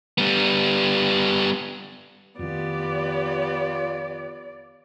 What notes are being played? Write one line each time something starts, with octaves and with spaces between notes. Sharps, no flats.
G3 B3
F2 D#3 B3 F4 G4 D5